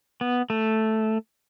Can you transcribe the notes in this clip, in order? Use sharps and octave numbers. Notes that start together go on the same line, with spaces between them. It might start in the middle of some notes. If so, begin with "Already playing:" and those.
B3
A3